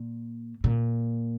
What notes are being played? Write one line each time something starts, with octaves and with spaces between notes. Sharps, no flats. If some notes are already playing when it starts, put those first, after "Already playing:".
Already playing: A#2
A#2